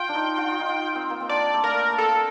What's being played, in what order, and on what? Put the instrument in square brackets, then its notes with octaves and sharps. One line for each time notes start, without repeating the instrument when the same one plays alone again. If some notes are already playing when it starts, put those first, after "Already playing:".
Already playing: [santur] F4 [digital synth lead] G5
[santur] D4
D#4
F4
D#4
C4
A#3
C4
[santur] D4 [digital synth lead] D5
[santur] A3
[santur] A#3 [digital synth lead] A#4
[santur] A3
[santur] A#3 [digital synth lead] A4